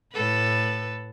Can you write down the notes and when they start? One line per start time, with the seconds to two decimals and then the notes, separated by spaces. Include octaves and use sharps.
0.13 A2 A4 B4